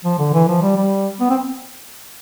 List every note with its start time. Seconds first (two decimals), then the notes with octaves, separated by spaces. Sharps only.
0.04 F3
0.19 D3
0.34 E3
0.48 F3
0.62 G3
0.77 G3
1.20 B3
1.30 C4